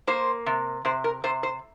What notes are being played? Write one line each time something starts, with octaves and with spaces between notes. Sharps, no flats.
A#3 C5
C3
C3 C5
A#4
C3 C5
C5